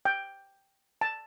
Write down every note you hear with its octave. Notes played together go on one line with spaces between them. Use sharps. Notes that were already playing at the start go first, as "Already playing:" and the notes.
G5
A5